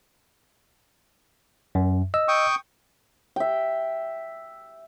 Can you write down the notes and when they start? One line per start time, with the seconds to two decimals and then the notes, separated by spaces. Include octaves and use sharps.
1.75 F#2
2.14 D#5 E6
2.28 G5 C#6 D#6
3.36 E5 G5